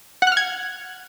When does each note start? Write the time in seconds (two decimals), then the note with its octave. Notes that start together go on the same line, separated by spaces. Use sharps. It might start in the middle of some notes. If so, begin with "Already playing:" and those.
0.22 F#5
0.27 F#6
0.32 F6
0.37 G#6